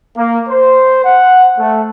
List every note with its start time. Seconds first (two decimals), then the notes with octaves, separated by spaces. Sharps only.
0.16 A#3
0.48 C5
1.04 F#5
1.58 A3